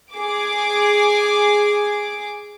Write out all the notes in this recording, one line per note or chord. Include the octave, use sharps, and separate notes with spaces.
G#4 D6